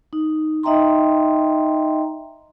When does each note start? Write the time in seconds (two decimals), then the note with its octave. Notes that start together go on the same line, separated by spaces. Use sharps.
0.13 D#4
0.63 D#4 D#5 E5 G5 A#5 C6